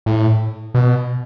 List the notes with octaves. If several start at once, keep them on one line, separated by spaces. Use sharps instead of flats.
A2
B2